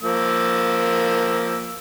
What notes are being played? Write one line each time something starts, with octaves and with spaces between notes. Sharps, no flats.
F3 A#3 E6